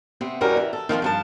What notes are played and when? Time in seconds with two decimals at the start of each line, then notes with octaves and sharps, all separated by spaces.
0.21 C3 B3 C4
0.41 E2 B2 G3 C#4 A#4
0.57 E3
0.73 A4
0.89 D#3 F3 B3 C4
1.02 G2 F3 A5